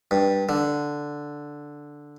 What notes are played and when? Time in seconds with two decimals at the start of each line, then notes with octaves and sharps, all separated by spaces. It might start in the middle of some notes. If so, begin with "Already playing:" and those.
0.11 G2
0.49 D3